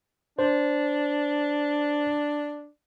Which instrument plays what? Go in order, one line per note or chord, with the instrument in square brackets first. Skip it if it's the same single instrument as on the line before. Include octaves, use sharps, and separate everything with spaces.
[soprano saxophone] D4 [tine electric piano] C5